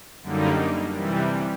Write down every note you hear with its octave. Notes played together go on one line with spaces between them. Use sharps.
F#2 D3 G3 A#3 D#4
C3 E3 G3